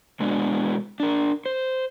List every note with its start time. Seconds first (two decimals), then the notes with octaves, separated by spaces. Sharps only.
0.20 B2 D3 G#3 B3 D4 F#4
1.00 D4 A#4
1.46 C5